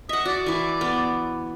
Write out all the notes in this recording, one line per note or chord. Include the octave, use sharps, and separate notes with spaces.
D#5 E5 F#5
F#4 D5
E3 E4
B3